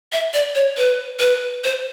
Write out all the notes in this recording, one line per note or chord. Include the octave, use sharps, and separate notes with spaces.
E5
D5
C#5
B4
B4
C5